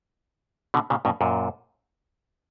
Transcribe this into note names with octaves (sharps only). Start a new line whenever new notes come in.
B2 D3
A#2 C#3
G2 B2
F#2 A#2